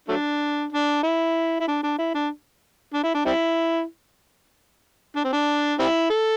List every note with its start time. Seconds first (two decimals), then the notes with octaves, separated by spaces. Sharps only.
0.08 F#3 A3 D4
0.72 D4
1.03 E4
1.60 E4
1.67 D4
1.83 D4
1.98 E4
2.14 D4
2.93 D4
3.03 E4
3.14 D4
3.25 G3 C4 E4
5.16 D4
5.24 C4
5.33 D4
5.79 G3 C4 E4
6.10 A4